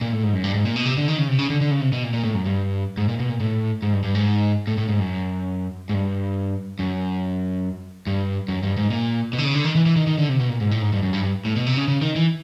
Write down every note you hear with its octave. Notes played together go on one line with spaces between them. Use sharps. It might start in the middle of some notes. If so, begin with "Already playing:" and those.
A#2
A2
G#2
F#2
G2
G#2
A#2
B2
C3
D3
D#3
C#3
C3
C#3
D3
D3
C#3
C3
B2
A#2
A#2
A2
F#2
G2
G#2
A#2
B2
A#2
A2
G#2
G2
G2
G#2
A2
A2
G#2
F#2
G#2
G2
F#2
G2
F#2
G2
G#2
A#2
B2
D3
C#3
D3
D#3
E3
E3
D#3
D#3
D3
C3
B2
A#2
G#2
A2
G#2
G2
F#2
G2
G2
A2
B2
C3
C#3
C#3
D#3
E3